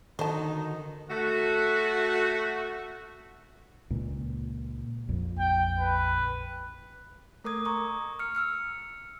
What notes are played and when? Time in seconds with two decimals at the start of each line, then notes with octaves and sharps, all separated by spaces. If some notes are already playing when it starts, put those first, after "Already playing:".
0.19 D3 D#3 D#4 F#4 C5 A5
1.11 A3 F#4
3.90 C#2 A#2
5.09 A#1 F2
5.39 G5
5.79 B4
7.44 A3 A#4 D6 D#6 G#6
7.65 A#5 C#6 D#6
8.19 F6 C#7
8.35 E6 F6 C#7